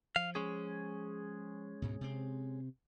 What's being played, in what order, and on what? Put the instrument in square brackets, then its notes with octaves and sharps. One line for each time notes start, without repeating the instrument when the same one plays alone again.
[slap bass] F3 [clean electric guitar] F5
[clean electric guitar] G#3 C#4 G#4
[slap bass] D2 G#2 B2
C3 C4